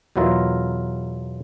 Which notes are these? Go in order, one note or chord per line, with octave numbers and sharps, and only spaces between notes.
E2 B2 F#3 E4 F4 A#4